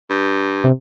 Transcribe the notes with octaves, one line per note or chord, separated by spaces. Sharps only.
G2
C3